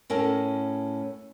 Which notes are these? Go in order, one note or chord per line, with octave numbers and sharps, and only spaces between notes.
A2 C#4 A#4 A5